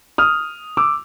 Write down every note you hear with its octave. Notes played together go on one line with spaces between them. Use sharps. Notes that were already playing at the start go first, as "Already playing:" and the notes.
D#6 F6
D6 E6